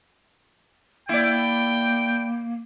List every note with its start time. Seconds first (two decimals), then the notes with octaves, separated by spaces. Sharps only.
1.09 A#3 E4 D5 G5